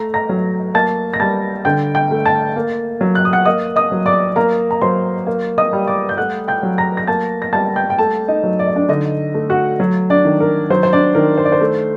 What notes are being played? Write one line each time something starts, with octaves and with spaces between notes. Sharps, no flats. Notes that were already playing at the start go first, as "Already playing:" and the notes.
Already playing: A3 A#5 A#6
A#5 A#6
F#3
A#3 A5 A6
A#6
G3 A5 A6
D3 G5 G6
G5 G6
A3
A5 A6
A#3
F#3
F#6
D#6
F#5 F#6
A#3 D#5 D#6
D#5 D#6
F#3
D5 D6
A#3 A#4 A#5
A#5
F#3 C5 C6
A#3
D#5 D#6
G3
D5 D6
G6
A3 F#5 F#6
G5 G6
F#3
A#5 A#6
A#6
A#3 A5 A6
A#6
G3 A5 A6
G5 G6
G5
A3 A4 A5
D#4 D#5
F#3
D5
D#5
D4 D5
D3 D#4 D#5
A3
F#4 F#5
F#3
D4 D5
D#3
A#4
F#3 C5
C5
D4 D5
D#3 A#4
C5
D5
C5
A3